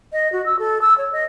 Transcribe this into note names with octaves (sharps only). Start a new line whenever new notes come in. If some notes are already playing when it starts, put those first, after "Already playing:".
D#5
F#4
E6
A4
E6
C#5
D#5